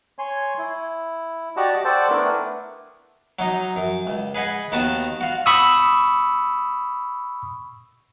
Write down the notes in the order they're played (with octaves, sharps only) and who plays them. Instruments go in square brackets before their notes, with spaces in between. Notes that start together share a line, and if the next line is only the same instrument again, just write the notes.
[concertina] C#5 G#5 C6
E4
F#4 G4 D5 D#5 F#5 A5
A4 C5 D5 F#5 G5 A5
A3 B3 D4 E4 A#4 B4
[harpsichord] F#3 D#4 D#5
F#2
C#2
G#4 B4 D#5 F#5 G#5
D#2 D#3 B3 F#4 A5 D#6
F4 F#4
[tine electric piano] B5 C#6 D#6 E6